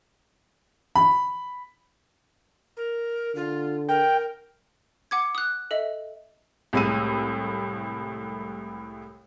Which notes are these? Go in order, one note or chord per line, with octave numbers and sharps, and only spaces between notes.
B5
A#4
D3 F4
A#4 G5
F#5 D6 G#6
D#6 F#6
A4 D#5 E5
C2 A2 G#3 E6 D#7